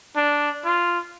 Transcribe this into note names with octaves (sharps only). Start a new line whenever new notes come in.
D4
F4